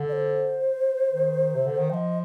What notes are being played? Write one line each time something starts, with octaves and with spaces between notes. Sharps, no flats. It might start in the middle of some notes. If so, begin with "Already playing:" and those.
Already playing: D3
D5
C5
D#3
C3
D3
D#3
F3 D#5 G5